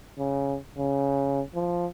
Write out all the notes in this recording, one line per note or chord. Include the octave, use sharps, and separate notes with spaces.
C#3
C#3
F3